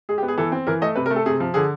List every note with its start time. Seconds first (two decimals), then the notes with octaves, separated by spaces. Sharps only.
0.09 G#3 G#4
0.18 G4
0.23 B3
0.28 G#4
0.38 E3 A4
0.52 C4
0.67 E3 A#4
0.81 A3 D#5
0.96 C3 B4
1.06 A#4
1.10 A3
1.16 A4
1.26 C3 G#4
1.40 F3
1.54 D3 G#4